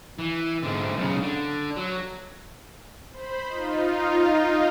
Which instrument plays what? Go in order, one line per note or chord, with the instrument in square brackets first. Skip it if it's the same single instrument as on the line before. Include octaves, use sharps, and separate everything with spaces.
[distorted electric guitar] E3
G#2 D3
B1 C#3
D3
F#3
[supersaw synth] C5 B5
D#4 F4